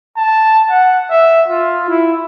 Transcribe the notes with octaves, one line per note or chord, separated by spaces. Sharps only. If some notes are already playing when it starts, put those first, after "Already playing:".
A5
F#5
E5
F4
E4